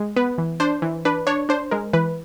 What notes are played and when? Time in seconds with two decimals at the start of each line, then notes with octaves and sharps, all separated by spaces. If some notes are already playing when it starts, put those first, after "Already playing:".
Already playing: G#3
0.16 B3 B4
0.38 E3
0.60 D4 C5
0.82 E3
1.05 D4 B4
1.27 D4 C#5
1.49 D4 C5
1.71 G#3 A#4
1.93 E3 B4